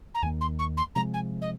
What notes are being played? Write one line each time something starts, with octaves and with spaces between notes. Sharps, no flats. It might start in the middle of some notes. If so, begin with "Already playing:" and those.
A#5
D#2 D#3 A#3 G#5
C6
C#6
C6
C3 F3 G#3 A#5
G#5
D#5